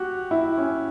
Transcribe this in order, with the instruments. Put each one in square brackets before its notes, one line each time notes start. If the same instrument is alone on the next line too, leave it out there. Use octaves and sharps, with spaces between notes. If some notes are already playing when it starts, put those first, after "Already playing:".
Already playing: [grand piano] F#4 G4
E4
C#4